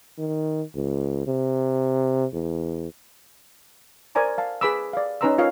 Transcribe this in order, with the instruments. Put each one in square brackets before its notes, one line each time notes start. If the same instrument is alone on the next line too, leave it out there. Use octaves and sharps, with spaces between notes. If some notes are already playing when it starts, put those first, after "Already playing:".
[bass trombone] D#3
C#2
C3
E2
[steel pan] A#4 C5 D5 G#5 A#5 C#6
F5 A5
G#4 B4 B5 D6 E6
D5 F5
C#4 D#4 B4 A#5 C6 E6
F4 A#4 C#5 D#5 F5